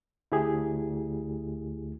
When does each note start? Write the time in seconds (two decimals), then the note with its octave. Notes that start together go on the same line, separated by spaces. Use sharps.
0.32 D2 E4 G4 G#4